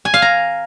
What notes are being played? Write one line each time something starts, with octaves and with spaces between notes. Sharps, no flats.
G#5
F5
A#5